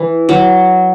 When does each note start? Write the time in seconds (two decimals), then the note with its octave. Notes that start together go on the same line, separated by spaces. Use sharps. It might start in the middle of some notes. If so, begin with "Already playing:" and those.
Already playing: E3
0.29 F#3